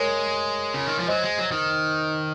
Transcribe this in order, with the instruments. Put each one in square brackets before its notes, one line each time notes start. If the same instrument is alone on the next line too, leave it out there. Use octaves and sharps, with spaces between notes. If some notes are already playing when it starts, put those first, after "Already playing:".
Already playing: [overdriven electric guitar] G#3 [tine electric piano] A#4 C#5
[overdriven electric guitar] C#3
D#3
F3
[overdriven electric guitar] F#3 [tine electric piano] C5 D#5
[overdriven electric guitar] G#3
F#3
D#3